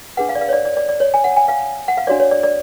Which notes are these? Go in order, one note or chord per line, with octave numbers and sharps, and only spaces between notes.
D4 G#4 B4 F#5
F5
D5
F5
C#5
D5
D5
D5
D5
C#5
G#5
F#5
G#5
F5
F#5
F5
D4 F#4 C#5 D5
C#5
D5
D5